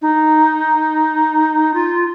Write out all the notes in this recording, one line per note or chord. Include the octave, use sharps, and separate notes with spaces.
D#4
F4